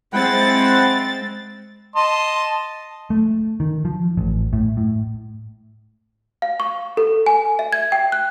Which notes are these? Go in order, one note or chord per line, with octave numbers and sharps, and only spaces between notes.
G#3 C4 E4 F#5 G5 A6
D#5 A5 C6
A3
D#3
F3
A1
A2
A2
F5
C#6
A4
G#5
E5
G#6
G5
F#6